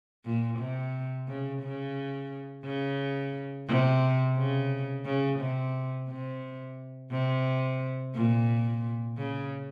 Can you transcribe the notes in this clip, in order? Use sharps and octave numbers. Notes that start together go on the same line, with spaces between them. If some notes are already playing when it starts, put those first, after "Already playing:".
A#2
C3
C#3
C#3
C#3
C3
C#3
C#3
C3
C3
C3
A#2
C#3